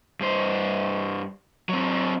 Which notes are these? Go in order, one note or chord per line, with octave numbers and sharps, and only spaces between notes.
G2 C5
F#3 C4